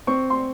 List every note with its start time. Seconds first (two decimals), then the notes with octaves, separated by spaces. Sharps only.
0.07 C4 C#6
0.30 C6